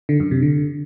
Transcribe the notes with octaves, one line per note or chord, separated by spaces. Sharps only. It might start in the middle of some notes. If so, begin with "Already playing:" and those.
D3
F#2
C3
D3